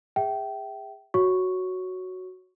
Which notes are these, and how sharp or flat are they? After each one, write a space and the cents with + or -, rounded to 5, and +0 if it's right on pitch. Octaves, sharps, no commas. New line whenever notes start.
G#4 -25 E5 +0 G5 -20
F#4 +0 C#5 +0 C#6 +0